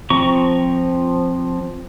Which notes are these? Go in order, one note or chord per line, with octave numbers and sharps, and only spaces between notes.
F3 C4 A#5 C#6